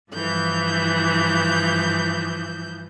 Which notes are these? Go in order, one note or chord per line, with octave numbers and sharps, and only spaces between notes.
G2 E3 F3 G6